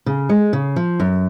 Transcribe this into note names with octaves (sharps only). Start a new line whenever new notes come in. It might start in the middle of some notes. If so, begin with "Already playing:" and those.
C#3
G#3
C#3
F3
F#2